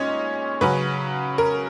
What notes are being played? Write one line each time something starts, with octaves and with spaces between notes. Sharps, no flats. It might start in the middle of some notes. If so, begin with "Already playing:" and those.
Already playing: A#2 G#3 C#4 D#4 C#5 D#5
C#3 F#3 C#4 B4
A#4